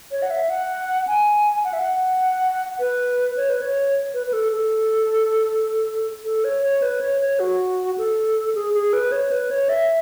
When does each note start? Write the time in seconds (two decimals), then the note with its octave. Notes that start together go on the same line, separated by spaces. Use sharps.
0.12 C#5
0.22 F#5
0.30 E5
0.50 F#5
1.07 G#5
1.64 F#5
1.73 E5
1.82 F#5
2.79 B4
3.37 C#5
3.49 B4
3.62 C#5
4.14 B4
4.27 B4
4.33 A4
4.52 A4
6.25 A4
6.44 C#5
6.62 C#5
6.82 B4
7.01 C#5
7.21 C#5
7.39 F#4
7.98 A4
8.55 G#4
8.74 G#4
8.93 B4
9.12 C#5
9.31 B4
9.51 C#5
9.69 E5